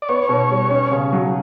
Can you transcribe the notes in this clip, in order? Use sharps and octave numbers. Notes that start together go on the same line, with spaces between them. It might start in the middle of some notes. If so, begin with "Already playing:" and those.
D5
B3 C#5
B2
G3
C#4
C#3
F#3